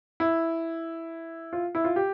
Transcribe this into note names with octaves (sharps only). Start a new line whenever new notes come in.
E4
F4
E4
F4
G4